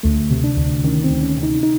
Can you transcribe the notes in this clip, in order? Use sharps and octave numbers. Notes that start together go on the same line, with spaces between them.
D2 A3
C3
D4
D2
D#3 C#4
C4
D2
C#4
C3
D#4
D#4